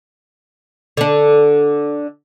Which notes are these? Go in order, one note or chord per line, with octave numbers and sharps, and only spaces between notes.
D3 D4